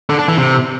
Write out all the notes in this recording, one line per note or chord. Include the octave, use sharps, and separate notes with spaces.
D3
D4
E3
C3